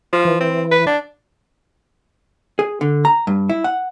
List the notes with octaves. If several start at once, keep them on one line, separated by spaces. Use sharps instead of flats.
F3 F4
E3
C4
B4
D4
G#4
D3
A#5
G2
E4
F#5